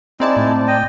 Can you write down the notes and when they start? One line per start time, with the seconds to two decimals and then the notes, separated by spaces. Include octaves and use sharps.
0.20 G#3 C4 D#4 E4 D5 A5
0.36 A2
0.67 D#5 G5